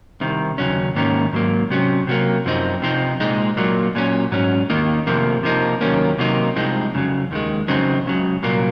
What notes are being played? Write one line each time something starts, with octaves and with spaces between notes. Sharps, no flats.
C2 C3 D#3
D#2 C#3 F#3 C#4
G#2 D#3 A#3 C#4
G#2 F#3 A#3
C3 F#3 C#4
C3 F#3 A#3
F#2 F3 C4 D#4
C3 F3 C4 D#4
A#2 G#3 D#4
A#2 F#3 A#3
A#2 F#3 C#4
G#2 F#3 C#4
D#2 D#3 A#3 D#4
F2 C3 F3 A#3
C3 F3 A#3 D#4
D#2 D#3 F#3 A#3 C#4
C3 F#3 A#3 D#4
C2 C3 F3 G#3 D#4
F2 C#3 F#3
D#2 D#3 G#3
F2 C#3 F#3 C4 D#4
C#2 C#3 F#3
C2 A#2 F#3 A#3